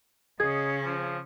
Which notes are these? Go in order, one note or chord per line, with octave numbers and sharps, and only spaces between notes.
C#3 C#4 G#4 D#5 G#6
F3